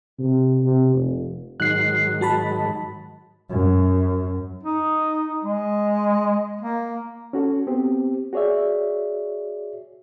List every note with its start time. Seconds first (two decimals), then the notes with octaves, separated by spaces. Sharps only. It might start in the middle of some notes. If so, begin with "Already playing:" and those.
0.19 C3
0.64 C3
0.94 F1
1.60 G#2 D#3 F#3 F#6 C7
2.21 F#4 A5 B5
3.50 F#2
4.63 D#4
5.44 G#3
6.61 A#3
7.33 C#4 F#4 A4
7.67 B3 C4 G4
8.33 F#4 G#4 C#5 D5 E5